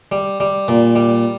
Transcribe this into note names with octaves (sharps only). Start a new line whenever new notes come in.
G3
G3
A#2
G3